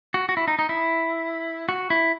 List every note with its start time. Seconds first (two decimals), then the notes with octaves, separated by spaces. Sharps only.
0.14 F#4
0.29 F#4
0.37 E4
0.48 D#4
0.59 D#4
0.69 E4
1.69 F#4
1.90 E4